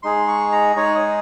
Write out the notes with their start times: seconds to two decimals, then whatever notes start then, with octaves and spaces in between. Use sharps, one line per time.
0.03 G#3 D#4 G#4 C6
0.28 C#6
0.52 A#5
0.76 G#3 D#4 G#4 C#5
0.95 D#5